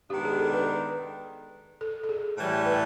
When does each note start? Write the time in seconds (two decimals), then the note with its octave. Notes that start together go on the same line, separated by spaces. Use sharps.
0.10 D#3 G#3 B3 D4 G4
0.25 G#4
0.39 A4
0.53 B4
1.81 A4
2.04 A4
2.09 G#4
2.37 A2 E3 G3
2.66 B4